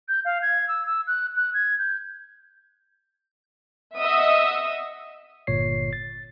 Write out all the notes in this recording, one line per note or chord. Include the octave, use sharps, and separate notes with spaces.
G6
F5
G#6
E6
E6
F#6
F#6
G#6
G6
D#5 E5 F#5 D#6 E6
G1 A#2 C#5 C7
A6